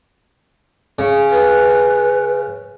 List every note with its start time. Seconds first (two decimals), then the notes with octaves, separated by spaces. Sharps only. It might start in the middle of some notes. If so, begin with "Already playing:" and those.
0.99 C#3
1.31 B4